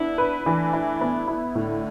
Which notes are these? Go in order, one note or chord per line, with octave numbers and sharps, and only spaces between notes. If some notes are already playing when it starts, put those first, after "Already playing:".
Already playing: B3 D4 E4
B4
E3 A3 D4
E4
B3
E4
A2 D3